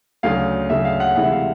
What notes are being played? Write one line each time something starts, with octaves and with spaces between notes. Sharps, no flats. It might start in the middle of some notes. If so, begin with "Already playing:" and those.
D2 C#3 F#3 F5
D2 C#3 F#3 E5
F5
F#5
D2 C3 E3 G#3 F#5
E5
F5